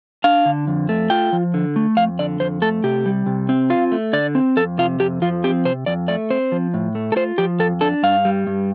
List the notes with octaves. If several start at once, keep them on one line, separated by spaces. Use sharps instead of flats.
D4 F5
D3
F2
A3
F4 G5
F3
D3
A3
F2 F5
D3 D5
F2 C5
A3 A4
C3 G4
G3
C3
C4
F4 F5
A3
D3 D5
C4
F2 A4
C3 F4
F2 G4
F3 F4
C4 G4
C3 C5
F2 D5
A3 D5
C4 C5
F3
A2
A3
A4
F4 C5
F3 G4
F2 A4
D4 A4
G2 F5
G3
G2